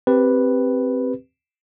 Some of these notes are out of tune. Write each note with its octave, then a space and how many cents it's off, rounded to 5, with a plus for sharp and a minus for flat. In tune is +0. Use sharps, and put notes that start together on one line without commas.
C4 +0 G4 +0 B4 +0